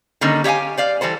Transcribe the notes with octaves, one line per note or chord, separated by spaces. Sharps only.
D3 D#3 G3 A#3 C#4 D#4
G4 C#5 D#5 F5 G#5
C5 D5 F5
E3 G3 A4 C5